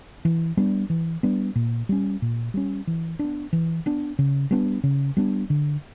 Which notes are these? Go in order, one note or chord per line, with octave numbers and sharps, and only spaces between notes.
E3
G3 B3 D4
E3
G3 B3 D4
A#2
G3 C#4
A#2
G3 C#4
E3
B3 D4
E3
B3 D4
C#3
G3 B3 D4
C#3
G3 B3 D4
D3